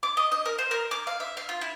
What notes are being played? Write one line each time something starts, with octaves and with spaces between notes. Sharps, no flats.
D6
D#5
D#5
A#4
C5
A#4
D6
F5
E5
F5
F4
E4